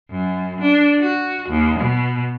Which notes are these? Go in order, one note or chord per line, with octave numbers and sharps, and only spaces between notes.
F#2
D4
F#4
D#2
B2